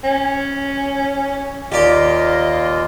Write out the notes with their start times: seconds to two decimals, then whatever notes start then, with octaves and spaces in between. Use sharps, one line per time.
0.04 C#4
1.72 D#2 A#3 F4 G4 D5 D#5